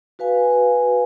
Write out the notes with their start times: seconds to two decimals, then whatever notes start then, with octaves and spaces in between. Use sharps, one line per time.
0.19 F#4 B4 F5 G#5